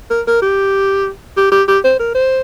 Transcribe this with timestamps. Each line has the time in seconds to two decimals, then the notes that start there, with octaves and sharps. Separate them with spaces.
0.10 A#4
0.27 A#4
0.42 G4
1.37 G4
1.52 G4
1.68 G4
1.84 C5
2.00 A#4
2.15 C5